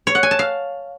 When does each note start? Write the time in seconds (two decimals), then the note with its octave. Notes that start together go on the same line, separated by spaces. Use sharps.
0.07 C#5
0.15 F#5
0.23 G#5
0.31 A5
0.39 F5